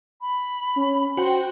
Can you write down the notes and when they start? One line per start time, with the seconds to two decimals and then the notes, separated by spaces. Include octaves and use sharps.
0.21 B5
0.76 C#4
1.17 F#4 C5 G5